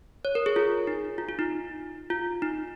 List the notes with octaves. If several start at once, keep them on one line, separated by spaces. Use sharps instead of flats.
C#5
A#4
G#4
F4
D#4
F4
F4
D#4
F4
D#4